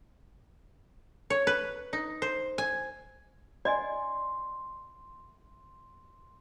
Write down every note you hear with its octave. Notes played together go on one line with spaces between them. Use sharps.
C#5
B4
D#4
C5
G#5
D5 D#5 G#5 C6